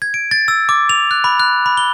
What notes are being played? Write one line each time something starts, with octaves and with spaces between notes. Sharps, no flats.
G#6
D7
A6
E6
D6
F7
F#6
B5
F#6
B5
G7